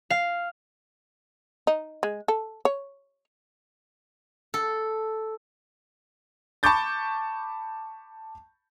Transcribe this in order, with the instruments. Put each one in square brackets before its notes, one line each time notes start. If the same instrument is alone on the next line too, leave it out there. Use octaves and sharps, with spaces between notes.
[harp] F5
[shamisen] D#4
G#3
A4
C#5
[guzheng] A4
[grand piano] A5 B5 C#6 D6 G6 A6